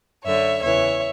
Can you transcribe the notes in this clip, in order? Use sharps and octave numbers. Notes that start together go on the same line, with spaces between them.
F#2 D3 C#5 E5
E2 C#3 E3 C#5 E5